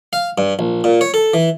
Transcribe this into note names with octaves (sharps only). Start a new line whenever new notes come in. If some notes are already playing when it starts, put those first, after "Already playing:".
F5
G2
A#1
A#2
C#5
A4
E3